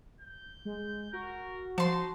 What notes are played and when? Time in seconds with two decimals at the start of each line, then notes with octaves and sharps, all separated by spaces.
0.21 G6
0.65 G#3
1.13 F#4 A#4
1.78 F3 D#4 A5 C6